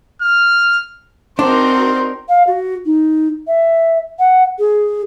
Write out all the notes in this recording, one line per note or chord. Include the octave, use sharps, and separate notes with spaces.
F6
C4 D4 D#4 F#4 A#4 C5 C6
F5
F#4
D#4
E5
F#5
G#4